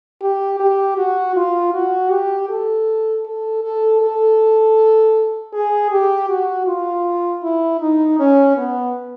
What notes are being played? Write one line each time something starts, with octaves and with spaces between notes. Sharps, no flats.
G4
G4
F#4
F4
F#4
G4
A4
A4
A4
A4
G#4
G4
F#4
F4
E4
D#4
C#4
B3